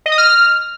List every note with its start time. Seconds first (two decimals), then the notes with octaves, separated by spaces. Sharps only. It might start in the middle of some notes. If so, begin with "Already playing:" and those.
0.06 D#5
0.12 D#6
0.18 F6